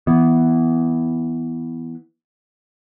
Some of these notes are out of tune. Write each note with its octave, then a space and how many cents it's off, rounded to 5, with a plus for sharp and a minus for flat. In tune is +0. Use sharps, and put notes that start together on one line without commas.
E3 +0 B3 +0